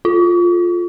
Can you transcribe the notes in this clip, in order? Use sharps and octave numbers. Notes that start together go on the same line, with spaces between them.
F4